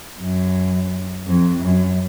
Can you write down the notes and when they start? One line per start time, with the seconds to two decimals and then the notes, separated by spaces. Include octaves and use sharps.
0.20 F#2
1.26 F2
1.63 F#2